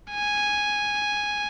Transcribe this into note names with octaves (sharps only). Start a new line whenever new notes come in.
G#5